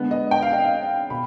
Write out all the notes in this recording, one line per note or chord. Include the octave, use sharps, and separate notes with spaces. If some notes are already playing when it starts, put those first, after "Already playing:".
Already playing: D3 G#3 B3
D#5
G5
F5
D#5
F5
B2 B5